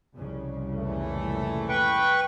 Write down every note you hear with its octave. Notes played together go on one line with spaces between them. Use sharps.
C2 F2 C#3
A#2 E3 A3
B4 G5 C#6